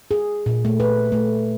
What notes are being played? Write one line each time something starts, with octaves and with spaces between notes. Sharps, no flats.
G#4
A#2
A3
B4
A3